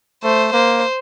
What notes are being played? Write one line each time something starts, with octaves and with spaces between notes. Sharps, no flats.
A3 C5
A#3 C5